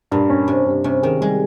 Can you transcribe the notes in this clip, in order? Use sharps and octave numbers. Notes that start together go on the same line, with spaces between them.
G2 A#2
C#4
G2 C3
G2
C3 C#4
D#3 G#4
G3 G#3